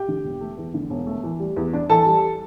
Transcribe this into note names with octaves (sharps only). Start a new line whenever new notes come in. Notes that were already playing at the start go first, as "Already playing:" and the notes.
Already playing: G4 G5
D3
E1
A3
E2
D3
E1
A3
E3
G3
E2
D4
E3 A4 A5
G3